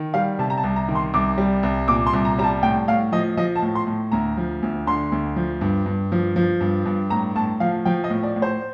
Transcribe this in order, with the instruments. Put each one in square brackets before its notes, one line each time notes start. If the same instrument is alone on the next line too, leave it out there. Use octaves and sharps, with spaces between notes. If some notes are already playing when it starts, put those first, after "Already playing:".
Already playing: [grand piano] D#3
G3 F5
C3 A5
A#5
A5
C2
A#5
D#3
C6
C2 D6
G3
C2
A#2 D6
C6
C2
A#5
G3 A#5
A5
A2 G5
A2 F5
F3 D#5
F3 D#5
A5
A2
C6
A2
D2 A#5
F3
D2
D3 C6
D2
F3
G2
G2
F3
F3
G2
G2
A2 A#5
A2 A5
F3 F5
F3 G5
D#5
A2
D5
A2
C5